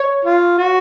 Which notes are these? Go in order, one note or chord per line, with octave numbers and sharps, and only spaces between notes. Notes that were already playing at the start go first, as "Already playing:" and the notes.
Already playing: C#5
F4
F#4